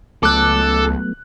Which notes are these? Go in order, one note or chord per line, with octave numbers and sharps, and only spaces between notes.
C#2 F#3 A3 B3 A4 D6 F#6